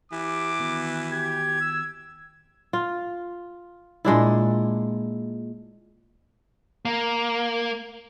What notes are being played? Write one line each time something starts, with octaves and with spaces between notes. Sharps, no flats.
E3 G4 D6
D#3 B3 F#4
G4 G#6
E6
F4
A#2 G#3 D4 E4
A#3